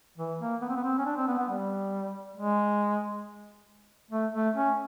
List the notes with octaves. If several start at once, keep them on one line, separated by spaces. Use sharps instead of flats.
E3
A#3
B3
C4
B3
C4
C#4
D4
C4
B3
B3
G3
G#3
A3
A3
C#4